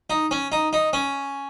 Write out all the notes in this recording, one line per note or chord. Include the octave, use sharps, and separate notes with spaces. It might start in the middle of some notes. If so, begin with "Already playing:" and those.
D#4
C#4
D#4
D#4
C#4